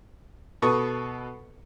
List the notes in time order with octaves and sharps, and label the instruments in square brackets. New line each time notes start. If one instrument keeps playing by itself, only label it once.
[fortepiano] B2 A4 B4 C#6 D#6